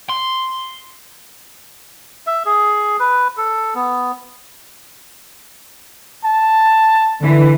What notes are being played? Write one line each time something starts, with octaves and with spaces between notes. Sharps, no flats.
C6
E5
G#4
B4
A4
B3
A5
D3 E3